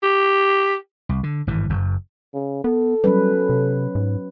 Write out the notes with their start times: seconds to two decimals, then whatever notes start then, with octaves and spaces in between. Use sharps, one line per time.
0.03 G4
1.09 C2
1.23 D3
1.47 G#1 G2 E3
1.69 F#1 F#2
2.34 C#3
2.64 B3 A4
3.04 F#3 G3 C#4 B4
3.49 C3
3.95 G#2